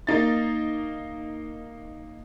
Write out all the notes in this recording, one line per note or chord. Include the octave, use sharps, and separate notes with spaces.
A#3 D#4 A6